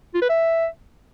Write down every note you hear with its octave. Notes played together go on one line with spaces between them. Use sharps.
F4
B4
E5